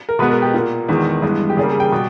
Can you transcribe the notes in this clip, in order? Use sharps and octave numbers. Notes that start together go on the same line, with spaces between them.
A#4
B2 G#3 B3 B4
A#4
G4
A#2 A#3
E2 D#3 G#3 B3
G2 E3 G#3 B3
G4
C#3 G3 A#3 G#4
G#4
G5
B2 G3